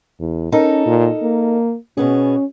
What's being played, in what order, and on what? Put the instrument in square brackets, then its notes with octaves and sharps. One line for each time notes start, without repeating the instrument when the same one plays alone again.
[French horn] E2
[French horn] C#4 [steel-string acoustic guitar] D#4 A4 A#4
[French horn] A#2
A#3
[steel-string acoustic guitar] B2 B3 G#4 [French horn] C#4